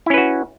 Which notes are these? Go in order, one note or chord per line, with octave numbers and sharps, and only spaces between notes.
C#4 E4 F#4 B4